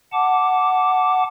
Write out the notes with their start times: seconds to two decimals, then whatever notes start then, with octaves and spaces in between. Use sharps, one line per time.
0.13 F#5 A5 D6